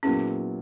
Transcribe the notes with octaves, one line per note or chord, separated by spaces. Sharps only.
A#2 F#3 B3 C#4 E4 G#4